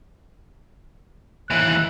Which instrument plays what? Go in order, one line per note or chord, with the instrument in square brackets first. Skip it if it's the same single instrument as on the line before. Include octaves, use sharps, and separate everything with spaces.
[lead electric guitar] D#2 E3 [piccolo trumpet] F#6